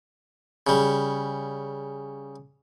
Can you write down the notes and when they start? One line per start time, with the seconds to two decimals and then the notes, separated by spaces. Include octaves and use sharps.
0.67 C#3 G3